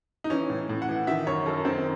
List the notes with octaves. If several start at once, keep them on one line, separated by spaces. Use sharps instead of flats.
D#4
E3 C#4
A2
A2
F#5
E3
D#3 E5
F#2 C#5
F#2 A4
D#3 C4